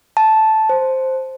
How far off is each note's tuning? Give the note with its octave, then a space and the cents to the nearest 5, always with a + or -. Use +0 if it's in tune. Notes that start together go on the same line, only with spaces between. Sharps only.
A5 -5
C5 +0